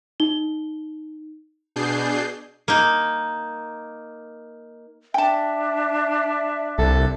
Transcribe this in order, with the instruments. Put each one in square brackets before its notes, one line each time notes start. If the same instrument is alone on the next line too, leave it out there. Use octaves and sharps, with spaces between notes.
[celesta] D#4 G7
[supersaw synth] B2 D4 G#4 G6 C7
[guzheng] A#3 D#4
[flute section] D4 E5 [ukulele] G5 A5
[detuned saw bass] C2 [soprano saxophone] A4